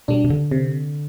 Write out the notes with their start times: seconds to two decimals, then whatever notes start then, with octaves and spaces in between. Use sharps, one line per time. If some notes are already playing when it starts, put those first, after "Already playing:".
0.08 B2 G3 D4
0.24 C3
0.30 D3
0.51 C3